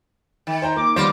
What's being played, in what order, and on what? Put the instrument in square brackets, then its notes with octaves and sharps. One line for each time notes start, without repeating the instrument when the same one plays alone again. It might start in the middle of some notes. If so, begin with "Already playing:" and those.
[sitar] D#3
[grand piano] C5 G5 A#5
[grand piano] A#3 [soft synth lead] D6
[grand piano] D#3 G3 B3 [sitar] F4 C5 [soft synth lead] D6